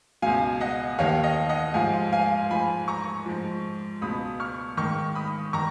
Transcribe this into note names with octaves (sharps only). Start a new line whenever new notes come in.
C#2 B2 F5 G#5
D#5 F#5
D#2 D#3 C#5 F5
D#5
D#5 F#5
G#2 F3 F5 G#5
F5 G#5
G#2 F3 G#5 B5
A#5 C#6
G#2 F3
C#2 B2 B5 D#6
C#6 F6
G#2 D#3 C#6 F6
B5 D#6
D#3 A#5 C#6